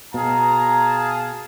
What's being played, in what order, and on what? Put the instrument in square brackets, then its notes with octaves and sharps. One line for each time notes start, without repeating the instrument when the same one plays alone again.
[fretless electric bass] B2 [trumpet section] G#4 F5 A5 [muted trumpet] A#5